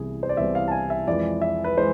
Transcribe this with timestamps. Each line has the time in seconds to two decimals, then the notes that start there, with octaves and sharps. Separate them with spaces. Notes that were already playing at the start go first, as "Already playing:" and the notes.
Already playing: C2 C3 E3 B3 G#4
0.23 C5
0.29 D5
0.37 C2 C3 E3 B3 E5
0.55 F5
0.68 A5
0.71 G#5
0.90 E5
1.07 F2 E3 G#3 D5
1.42 E5
1.64 B4
1.77 E3 G#3 C5